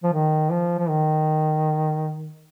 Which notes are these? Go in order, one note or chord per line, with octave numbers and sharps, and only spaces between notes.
F3
D#3
F3
F3
D#3